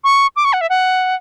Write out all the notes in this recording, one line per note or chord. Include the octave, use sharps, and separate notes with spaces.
C#6
D6
C#6
F#5
E5
F#5